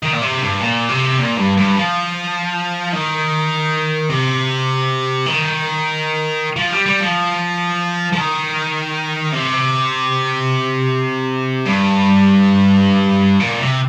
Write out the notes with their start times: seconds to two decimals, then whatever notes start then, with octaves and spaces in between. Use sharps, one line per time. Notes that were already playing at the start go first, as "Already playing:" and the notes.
0.03 D#3
0.13 A#2
0.22 C3
0.41 G2
0.60 A#2
0.89 C3
1.19 A#2
1.37 G2
1.57 G2
1.77 F3
2.93 D#3
4.10 C3
5.26 D#3
6.57 F3
6.71 G3
6.86 G3
7.01 F3
8.12 F3
8.17 D#3
9.33 C3
11.66 G2
13.40 A#2
13.60 C3